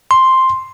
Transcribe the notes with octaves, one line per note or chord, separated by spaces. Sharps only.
C6